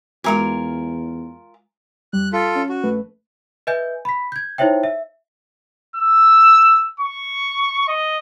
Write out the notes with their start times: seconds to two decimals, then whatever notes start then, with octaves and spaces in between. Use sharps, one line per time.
0.24 E2 G#3 F4 F#4 A#4 G#5
2.13 F2 G3 F#6
2.33 F4 A4 B6
2.55 C#4
2.69 F#4
2.83 A#1 A3 B4
3.67 B4 D#5 E5 G#5 G6
4.05 B5 B6
4.32 G6 G#6
4.58 D#4 E4 C5 C#5 E5 G5
4.83 E5
5.96 E6
7.00 C#6
7.88 D#5